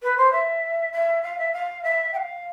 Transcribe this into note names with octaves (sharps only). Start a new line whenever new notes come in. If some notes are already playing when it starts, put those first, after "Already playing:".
B4
C5
E5
E5
F5
E5
F5
E5
G5
F5